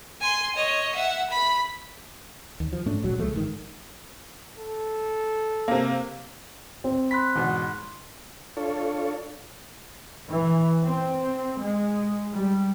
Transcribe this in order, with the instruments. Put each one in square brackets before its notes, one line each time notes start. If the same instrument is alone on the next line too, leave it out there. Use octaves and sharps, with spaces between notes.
[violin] G#5 C6
C#5 D#5
E5 F#5
B5
[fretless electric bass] D#2
F3
G#2 A3 C#4 D4
D#1 A#1 F#3 G#3
C#2 F3 G#3 A3
G1 G#2 D#3
[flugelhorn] A4
[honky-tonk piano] C3 A#3
[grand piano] C4
[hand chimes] B5 C6 F#6 [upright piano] B6
[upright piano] E2 G#2 B2
[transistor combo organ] D4 F4 A4 C#5
[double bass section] E3
C4
G#3
G3